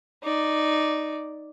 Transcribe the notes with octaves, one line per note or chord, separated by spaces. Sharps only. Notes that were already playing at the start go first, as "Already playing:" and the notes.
D#4 D5